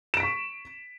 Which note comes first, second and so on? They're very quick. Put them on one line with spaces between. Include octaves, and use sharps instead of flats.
E7 D7 B6 C#6